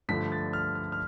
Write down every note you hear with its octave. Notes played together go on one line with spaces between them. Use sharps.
G2 D3 F3 A3 B6
A6
F6
F6
F6